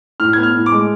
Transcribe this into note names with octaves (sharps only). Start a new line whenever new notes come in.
A2 F6
B3 G#6
F6
A2
D6
G#3